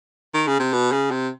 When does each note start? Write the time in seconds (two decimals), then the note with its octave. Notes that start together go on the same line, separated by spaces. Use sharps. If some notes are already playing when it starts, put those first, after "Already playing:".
0.34 D#3
0.47 C#3
0.59 C3
0.73 B2
0.92 C#3
1.11 C3